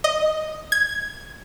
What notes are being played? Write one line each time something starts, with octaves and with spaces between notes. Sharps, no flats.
D#5
G#6